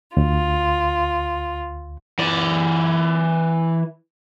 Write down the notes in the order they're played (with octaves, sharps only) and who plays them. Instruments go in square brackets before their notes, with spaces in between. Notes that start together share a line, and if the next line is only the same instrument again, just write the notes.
[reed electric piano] D2 [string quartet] F4
[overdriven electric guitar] E3 D5